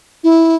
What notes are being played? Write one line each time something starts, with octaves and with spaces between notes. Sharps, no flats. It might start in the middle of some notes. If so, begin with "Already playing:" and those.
E4